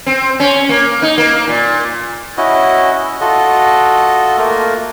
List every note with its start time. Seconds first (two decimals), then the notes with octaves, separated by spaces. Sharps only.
0.06 C4
0.40 C#4
0.69 A#3
1.02 D#4
1.18 A#3
1.48 A#2
2.37 C#4 E4 F#4 D#5
3.21 F4 F#4 A4 D#5
4.38 A3 A#3 F4 A#4